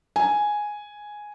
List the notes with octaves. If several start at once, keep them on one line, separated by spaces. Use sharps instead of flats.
G#5